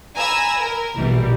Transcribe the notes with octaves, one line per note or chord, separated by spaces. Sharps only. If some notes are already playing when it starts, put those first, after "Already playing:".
G#5 A#5 B5 E6
A#4
A#1 B2 E3 G3